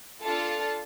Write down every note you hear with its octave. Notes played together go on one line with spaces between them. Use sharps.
D4 F4 A4 A5